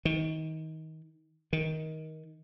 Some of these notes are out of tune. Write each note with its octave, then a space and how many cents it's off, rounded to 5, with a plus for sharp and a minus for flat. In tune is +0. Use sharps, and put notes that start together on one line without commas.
D#3 +30
D#3 +20